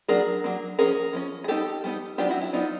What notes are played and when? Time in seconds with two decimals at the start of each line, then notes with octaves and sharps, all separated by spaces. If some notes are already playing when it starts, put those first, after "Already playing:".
0.09 F#3 A#3 D4 G#4 A#4
0.44 F#3 A#3 D4
0.79 F3 A#3 C#4 G#4 A#4
1.13 F3 A#3 C#4
1.44 G#4
1.48 G3 B3 D#4 G4 A4
1.84 G3 B3 D#4
2.18 F#3 B3 D4 F4 G4
2.30 E4 F#4
2.41 E4
2.53 F#3 B3 D4 D#4 F4